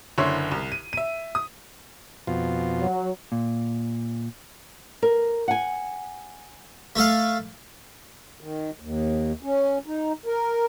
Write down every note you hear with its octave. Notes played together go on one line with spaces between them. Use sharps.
F#1 D3 E4 C#5 C6
C2
D#7
E5 D#7
D#6
F2 B2 F4
F#3
A#2
A#4
F#5 G#5
A3 A4 F5
D#3
D#2
C#4
D#4
A#4